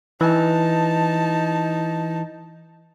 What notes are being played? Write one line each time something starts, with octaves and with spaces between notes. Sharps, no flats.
E3 D#4 A5